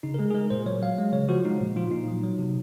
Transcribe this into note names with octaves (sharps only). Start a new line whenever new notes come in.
C#3 D#4
A#4
G#3 G#4
G#4
G#3 A#4
A#2 C5
F#3 C#5
F#3 F5
G#3
C#3 C#5
F3 F#4
G#3 D#4
A#2
F3 F4
A#2 D#4
F#3
F#3
C3